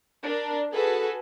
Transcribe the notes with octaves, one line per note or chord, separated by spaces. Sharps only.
D4 A#4
F#4 G#4 A4 B4